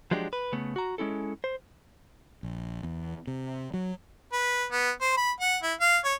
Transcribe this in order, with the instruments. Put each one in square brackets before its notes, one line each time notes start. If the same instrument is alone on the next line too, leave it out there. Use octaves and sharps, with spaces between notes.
[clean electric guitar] F3 F#3 G#3 D4 G4
B4
C#3 A3 B3
F#4 A#5
G#3 C#4 E4 A4
C5
[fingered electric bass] A#1
E2
C3
F#3
[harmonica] B4
B3
C5
B5
F#5
E4
F5
C#5